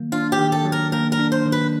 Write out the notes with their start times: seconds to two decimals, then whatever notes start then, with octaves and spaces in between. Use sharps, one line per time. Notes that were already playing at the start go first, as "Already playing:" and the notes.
Already playing: D#3 F#3 A#3
0.12 D4 F4
0.32 G4
0.39 D#3
0.52 A4
0.65 F#3
0.72 A#4
0.92 A#3 A#4
1.12 A#4
1.19 D4
1.32 C5
1.46 D#3
1.52 B4